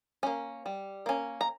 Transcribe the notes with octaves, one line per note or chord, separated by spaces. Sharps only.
A#3 C#4
G3
A#3 C#4
A#5